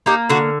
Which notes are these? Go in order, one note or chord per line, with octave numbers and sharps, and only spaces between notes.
A#3 D#4 G4
D3 D4 F#4